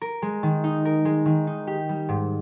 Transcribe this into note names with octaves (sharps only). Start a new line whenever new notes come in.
A#4
G#3
D#3
D#4
A#4
G#3
D#3
D#4
G4
G3
G#2